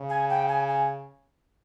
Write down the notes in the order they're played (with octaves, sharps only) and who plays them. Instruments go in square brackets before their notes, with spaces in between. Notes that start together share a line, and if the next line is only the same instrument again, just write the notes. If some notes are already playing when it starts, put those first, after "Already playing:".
Already playing: [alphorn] C#3
[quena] G#5
G5
G#5
G#5